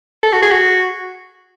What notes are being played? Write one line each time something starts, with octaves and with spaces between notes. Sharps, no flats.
A4
F#4
G#4
F#4